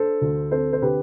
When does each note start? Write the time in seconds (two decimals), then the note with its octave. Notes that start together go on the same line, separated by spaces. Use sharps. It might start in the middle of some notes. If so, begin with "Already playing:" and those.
Already playing: D4 A4 C5
0.21 D2
0.51 C4 A4 C5
0.73 C5
0.82 D3 G4 B4